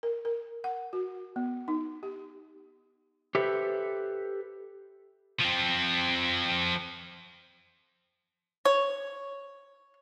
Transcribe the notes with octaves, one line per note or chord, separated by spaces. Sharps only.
A#4
A#4
F#5
F#4
B3
D#4
G4
G4 A4 B4 C5 E5
F3 C4
C#5